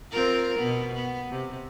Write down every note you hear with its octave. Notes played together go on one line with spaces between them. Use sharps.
C4 F4 A#4
B2 B3
B3
C3